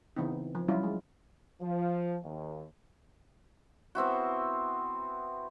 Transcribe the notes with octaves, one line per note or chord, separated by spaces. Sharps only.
C#3 E3 B3 C4 D#4
F3
F#3 G3 C#4 E4 F4
G#3
F3
D#2
B3 C4 E4 F#4